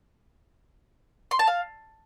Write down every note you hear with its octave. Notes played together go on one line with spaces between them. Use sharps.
C6
A5
F5